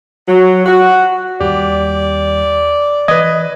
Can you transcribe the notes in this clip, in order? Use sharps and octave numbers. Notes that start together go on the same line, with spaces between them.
F#3
F#4
D#2 G3 G4 D5
E3 B4 D#5 G#6